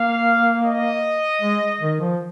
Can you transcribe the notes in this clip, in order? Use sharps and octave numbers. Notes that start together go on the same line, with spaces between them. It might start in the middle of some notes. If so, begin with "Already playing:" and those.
Already playing: A#3 F5
D#5
G#3
D#3
F3